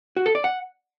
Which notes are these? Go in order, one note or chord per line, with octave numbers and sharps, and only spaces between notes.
F#4
A4
D5
F#5